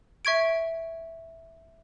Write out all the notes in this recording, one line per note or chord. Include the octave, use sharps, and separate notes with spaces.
E5 C#6 G#6 D7